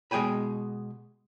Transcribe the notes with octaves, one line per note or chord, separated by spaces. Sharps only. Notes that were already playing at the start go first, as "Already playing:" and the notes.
B2 G#3 G#4 G5 G#5 B5